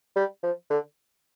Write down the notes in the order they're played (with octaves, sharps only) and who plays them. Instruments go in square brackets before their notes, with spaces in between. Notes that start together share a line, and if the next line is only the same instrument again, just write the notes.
[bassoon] G3
F3
D3